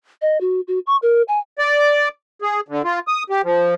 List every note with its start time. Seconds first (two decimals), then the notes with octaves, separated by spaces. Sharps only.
0.22 D#5
0.41 F#4
0.68 F#4
0.87 C#6
1.02 A#4
1.28 G#5
1.59 D5
2.42 G#4
2.68 D3
2.84 F4
3.08 D#6
3.30 G4
3.44 F3